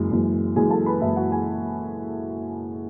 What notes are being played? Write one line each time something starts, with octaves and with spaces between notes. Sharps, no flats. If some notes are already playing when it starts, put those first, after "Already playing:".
Already playing: F#1 F#2 E3 G#3
F#1 F#2 E3 G#3
F#1 F#2 E3 G#3 G#4 G#5
A4 A5
B4 B5
F#1 F#2 E3 G#3 E4 E5
F#4 F#5
G#4 G#5